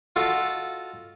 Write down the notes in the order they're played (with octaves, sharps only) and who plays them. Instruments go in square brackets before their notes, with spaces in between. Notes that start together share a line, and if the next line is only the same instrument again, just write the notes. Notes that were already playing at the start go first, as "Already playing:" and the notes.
[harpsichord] F4 F#4 A4 D#5 F5